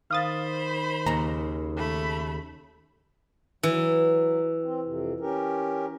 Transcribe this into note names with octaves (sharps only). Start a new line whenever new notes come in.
D#3 C5 F5 B5 D#6 A6
D#2 C#3 A#5
A3 B5
E3 F#3
C4
F2 C3
C#4 G4 A#4